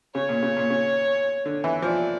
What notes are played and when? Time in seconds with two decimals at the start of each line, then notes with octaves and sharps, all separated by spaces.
0.15 C#3 C#5
0.29 A#2
0.42 C#3
0.57 A#2
0.70 C#3
1.46 D3
1.64 E3
1.82 F3 D5